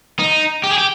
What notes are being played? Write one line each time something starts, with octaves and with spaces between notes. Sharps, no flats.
D#4
G4
G#4
G4